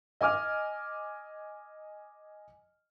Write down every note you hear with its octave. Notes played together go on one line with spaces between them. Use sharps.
D#5 G#5 D6 F6